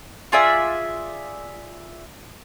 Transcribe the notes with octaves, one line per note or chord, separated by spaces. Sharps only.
F4 G#4 D5 E5